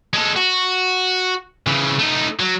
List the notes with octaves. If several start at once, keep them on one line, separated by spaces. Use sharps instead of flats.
G#3 A4
F#4
C#3 E3
A3 D#4
F#3